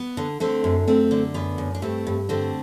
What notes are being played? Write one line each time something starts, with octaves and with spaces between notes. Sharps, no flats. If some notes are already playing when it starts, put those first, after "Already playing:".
Already playing: B3
D3
D3 A3 C4
F#2
F#2 A3 C4
D3
F#2 B3
F#2
D4
G2 A3 C4
G2
D3 A3 C4